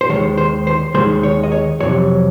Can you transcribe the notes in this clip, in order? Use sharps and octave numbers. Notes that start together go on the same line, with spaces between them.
C5
D#2 D#3 G#3 C#5
C5
C5
D#2 D#3 G#3 C5
C#5
D#5
C#5
F2 C3 F#3 C#5